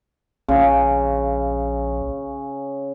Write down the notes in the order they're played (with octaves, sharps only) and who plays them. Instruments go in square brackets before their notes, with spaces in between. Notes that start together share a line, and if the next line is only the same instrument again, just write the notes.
[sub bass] A#1 [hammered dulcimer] C#3